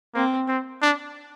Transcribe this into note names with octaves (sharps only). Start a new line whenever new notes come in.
A#3 C4
C4
D4